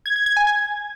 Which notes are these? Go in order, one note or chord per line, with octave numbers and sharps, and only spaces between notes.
G#6
G#6
G#6
G#5
G#6